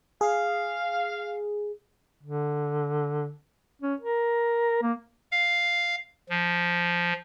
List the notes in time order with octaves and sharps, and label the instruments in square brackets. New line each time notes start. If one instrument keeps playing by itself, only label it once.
[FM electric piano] G#4 [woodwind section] F5
[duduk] D3
C#4
A#4
A#3
[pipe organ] F5
F3